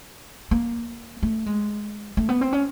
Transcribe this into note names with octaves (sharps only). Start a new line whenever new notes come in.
A#3
A3
G#3
A3
B3
C4
C#4